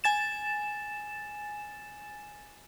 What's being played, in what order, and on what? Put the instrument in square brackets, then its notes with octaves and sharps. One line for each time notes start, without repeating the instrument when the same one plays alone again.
[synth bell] G#5 A6 E7